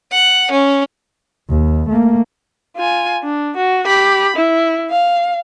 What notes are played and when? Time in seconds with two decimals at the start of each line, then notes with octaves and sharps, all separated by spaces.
0.12 F#5
0.51 C#4
1.50 D#2
1.89 A3 A#3
2.76 F4 G#5
3.23 D4
3.57 F#4
3.86 G4 B5
4.37 E4
4.91 F5